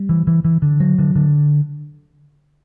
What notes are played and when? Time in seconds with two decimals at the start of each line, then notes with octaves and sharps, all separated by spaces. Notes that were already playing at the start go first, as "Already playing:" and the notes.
Already playing: G3
0.09 E3
0.27 E3
0.45 E3
0.62 D3
0.80 F#3
0.99 D3
1.16 D3